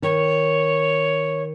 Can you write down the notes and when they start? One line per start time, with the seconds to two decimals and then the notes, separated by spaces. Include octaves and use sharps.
0.02 D#3 C#5